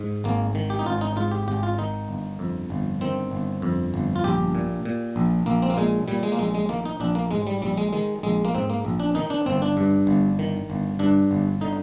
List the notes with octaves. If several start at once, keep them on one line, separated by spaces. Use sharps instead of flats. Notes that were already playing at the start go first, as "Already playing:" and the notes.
Already playing: G#2
G#1 A#3
D#3
G4
D#4
G#1 F4
D#4
G#2 F4
G4
G#1 G4
F4
D#3 D#4
G1
F2
G1
D#3 C4
G1
F2
G1
F4
A#1 G4
A#2
A#2
A#1
A#1 A#3
C4
A#3
A#2 G#3
A#2 G3
G#3
A#3
A#1 G#3
G#3
D#3 A#3
D#4
A#1 D4
A#3
G#2 G#3
G3
A#1 G3
G#3
D#3 G#3
A#1 G#3
A#3
G#2 C4
A#3
A#1
D4
D#3 D#4
D4
G1 C4
D4
G2
G1
D#3
G1
G2 D4
G1
D3 D#4